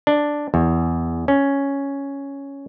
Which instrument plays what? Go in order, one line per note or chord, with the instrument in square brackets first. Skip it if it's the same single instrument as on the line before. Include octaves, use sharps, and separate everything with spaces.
[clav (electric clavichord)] D4
E2
C#4